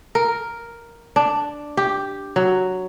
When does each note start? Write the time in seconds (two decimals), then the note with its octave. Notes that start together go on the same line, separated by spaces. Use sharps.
0.15 A#4
1.16 D4
1.77 G4
2.36 F#3